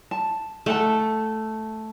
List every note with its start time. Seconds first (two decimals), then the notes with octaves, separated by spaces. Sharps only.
0.11 A5
0.66 A3 A4 F#5 A5